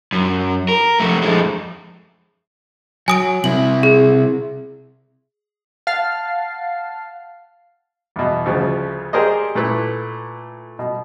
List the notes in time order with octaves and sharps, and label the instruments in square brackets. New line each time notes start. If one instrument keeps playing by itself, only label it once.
[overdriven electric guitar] F#2
A#4
F2 A3
F2 G#3
[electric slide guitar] F#3 [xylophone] G#5 D#6 D7
[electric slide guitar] C3 E4 [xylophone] F#7
[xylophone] G#4
[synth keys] F5 F#5 A5 C7
[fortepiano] E2 B2
D2 C#3 F3
G4 G#4 A#4 C5 D5 D#5
A#2 A3 E4 B4
B2